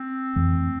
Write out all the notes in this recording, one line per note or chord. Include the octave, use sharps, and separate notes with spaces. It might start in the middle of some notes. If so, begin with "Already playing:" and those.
Already playing: C4
F2 E3 A3